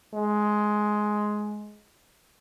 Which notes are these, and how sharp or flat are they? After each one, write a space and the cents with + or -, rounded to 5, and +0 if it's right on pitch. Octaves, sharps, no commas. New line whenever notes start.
G#3 +10